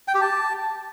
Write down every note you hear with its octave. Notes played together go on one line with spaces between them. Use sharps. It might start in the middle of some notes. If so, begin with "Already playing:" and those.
G5
G4
A5